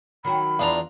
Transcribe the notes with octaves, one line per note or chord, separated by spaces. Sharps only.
D#3 F#3 F#4 B5
E2 D4 F4 A#5